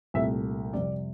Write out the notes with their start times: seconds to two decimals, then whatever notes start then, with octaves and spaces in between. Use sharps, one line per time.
0.14 C2 A#2 A3 E5
0.73 F2 C3 G3 D5